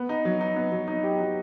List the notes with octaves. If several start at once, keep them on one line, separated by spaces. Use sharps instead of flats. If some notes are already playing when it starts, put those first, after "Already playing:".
Already playing: B3
D#4
F#3
D#4
B3
F#3
D#4
G4
F#3